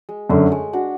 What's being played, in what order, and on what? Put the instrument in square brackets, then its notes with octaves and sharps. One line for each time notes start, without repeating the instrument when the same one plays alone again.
[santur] G#3
[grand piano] F#2 D3 [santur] A3
[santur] G#3
D4 F#4